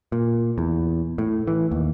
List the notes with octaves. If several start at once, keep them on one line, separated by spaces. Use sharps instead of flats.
A#2
E2
A2
E3
D#2